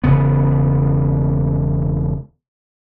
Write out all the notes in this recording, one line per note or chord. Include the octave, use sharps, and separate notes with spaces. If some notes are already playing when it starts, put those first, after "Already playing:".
E1 C#3 B3